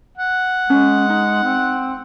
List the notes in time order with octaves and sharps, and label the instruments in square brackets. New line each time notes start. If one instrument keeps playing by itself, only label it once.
[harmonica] F#5
[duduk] G#3 [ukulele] C#4
[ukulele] D#4
[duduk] C4